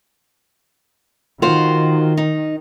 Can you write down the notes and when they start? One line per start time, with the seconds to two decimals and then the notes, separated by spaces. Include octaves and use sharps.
1.42 D#3 F4 F#4 C5
2.17 D#4